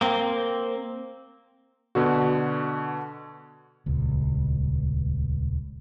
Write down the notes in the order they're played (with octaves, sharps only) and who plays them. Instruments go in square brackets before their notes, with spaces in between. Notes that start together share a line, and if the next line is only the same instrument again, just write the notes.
[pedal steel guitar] A#3 C4
[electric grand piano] B2 D3 F#4
[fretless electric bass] D#1 C#2